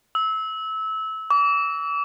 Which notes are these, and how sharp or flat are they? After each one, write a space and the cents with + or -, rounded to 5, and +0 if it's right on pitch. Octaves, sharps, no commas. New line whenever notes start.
E6 -25
D6 -40